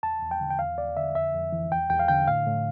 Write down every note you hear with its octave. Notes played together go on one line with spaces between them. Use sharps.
E2 A5
E2
G5
D3
G5
E2 F5
E2 D5
D3 E5
F2 E5
F2
E3
E2 G5
E2 G5
F5
D3 G5
A2 F5
A2